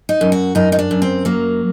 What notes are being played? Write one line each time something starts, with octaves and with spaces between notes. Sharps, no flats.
D#4
F#2
F#4
F#2 D#4
D#4
D4
F#2
C4
F#3 A#3